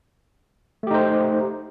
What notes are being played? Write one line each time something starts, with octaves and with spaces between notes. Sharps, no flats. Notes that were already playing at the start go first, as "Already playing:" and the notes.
A3 D#4 G4 C5